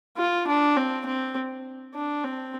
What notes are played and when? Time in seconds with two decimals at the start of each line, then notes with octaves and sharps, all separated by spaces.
0.17 F4
0.47 D4
0.76 C4
1.06 C4
1.94 D4
2.24 C4